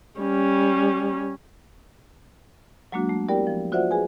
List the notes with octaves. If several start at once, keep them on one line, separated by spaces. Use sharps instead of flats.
G3 C#4
F#3 G#3 A#3 D4 F#4
A3
B3 E4 G4 A#4 D5 G5
F3
F4 F#4 C5 D5 E5 F#5
G#4 B4 G#5